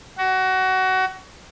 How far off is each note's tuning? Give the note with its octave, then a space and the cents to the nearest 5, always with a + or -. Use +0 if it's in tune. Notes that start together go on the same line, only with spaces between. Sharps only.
F#4 +25